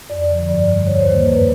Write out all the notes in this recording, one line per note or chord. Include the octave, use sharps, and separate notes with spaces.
F2 D5
D3 F3
G2 D5
D3 G3
D#2 C#5
C5
D#3 G3 A#3
F#2 B4